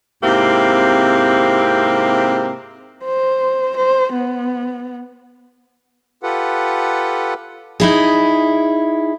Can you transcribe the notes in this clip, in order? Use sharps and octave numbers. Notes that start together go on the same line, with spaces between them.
G#2 C3 A#3 C4 E4 G4
C5
C5
B3
F4 G4 A4 B4 F#5
D#4 E4 G#4